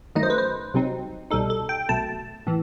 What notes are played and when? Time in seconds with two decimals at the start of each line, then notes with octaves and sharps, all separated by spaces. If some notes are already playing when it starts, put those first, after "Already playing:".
0.15 F#2 D#3 F#3 A3 D#4 D#5
0.23 C5
0.30 B4
0.38 C5
0.74 C2 C3 F#3 C4 D#4
1.31 C2 B2 G3 D#4 A4
1.50 A4
1.69 G5
1.89 B1 B2 A3 A5
2.47 A2 E3